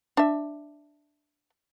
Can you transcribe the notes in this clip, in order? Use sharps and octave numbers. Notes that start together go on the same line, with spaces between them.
D4 E5